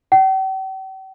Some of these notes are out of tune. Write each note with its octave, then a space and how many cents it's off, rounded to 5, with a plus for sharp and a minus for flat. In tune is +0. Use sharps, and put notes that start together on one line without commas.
G5 -45